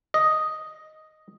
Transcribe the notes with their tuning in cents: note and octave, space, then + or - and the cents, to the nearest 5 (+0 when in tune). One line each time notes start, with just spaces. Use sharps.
D#5 +0